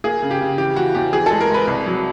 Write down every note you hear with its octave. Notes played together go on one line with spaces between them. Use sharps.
A#3 G#4
C#3
G4
C#3
E3 G4
E3 F#4
E2 G4
E3 G#4
G#3 A4
A#4
G#3 B4
C2
F#3